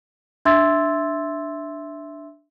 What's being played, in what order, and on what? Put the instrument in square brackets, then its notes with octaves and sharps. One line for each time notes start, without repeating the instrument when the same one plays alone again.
[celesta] D4 E5 C6 E6 G#6 A6